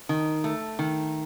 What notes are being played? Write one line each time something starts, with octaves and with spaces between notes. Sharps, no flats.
D#3
A3
D#3